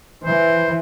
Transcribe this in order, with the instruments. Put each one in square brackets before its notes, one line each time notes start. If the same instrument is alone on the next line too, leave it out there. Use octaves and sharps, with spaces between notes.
[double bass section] E3 [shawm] C5